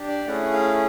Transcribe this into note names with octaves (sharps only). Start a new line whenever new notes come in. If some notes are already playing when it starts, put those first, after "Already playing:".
Already playing: D4 G4
D5
A3 C#4 E4 G#4 F#5
F5